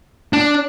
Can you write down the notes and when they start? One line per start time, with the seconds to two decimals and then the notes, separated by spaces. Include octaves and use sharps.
0.33 D4